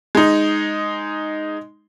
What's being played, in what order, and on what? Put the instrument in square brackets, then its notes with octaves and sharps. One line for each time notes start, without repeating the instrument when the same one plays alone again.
[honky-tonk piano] G#3 D#4